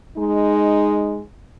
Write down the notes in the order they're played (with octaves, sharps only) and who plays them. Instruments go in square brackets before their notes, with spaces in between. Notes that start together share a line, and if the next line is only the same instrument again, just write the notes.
[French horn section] G#3 D#4